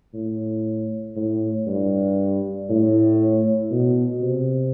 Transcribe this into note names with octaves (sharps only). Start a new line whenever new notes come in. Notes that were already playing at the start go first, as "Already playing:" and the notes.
A2
A2
G2
A2
B2
C3